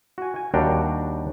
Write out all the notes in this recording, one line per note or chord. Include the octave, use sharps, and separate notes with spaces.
F#4 G#5
G#5
D#2 G3 D4 F#4 G5 A#5